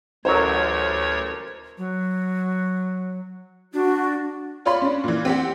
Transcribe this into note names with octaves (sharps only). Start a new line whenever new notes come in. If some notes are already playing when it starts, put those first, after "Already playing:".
A1 D2 F#3 A#4 C5 C#5
F#3
D4 F#4
F4 C#5 D5 B5 C6
C#4 D4
A#2 E3
C4 G4 F#5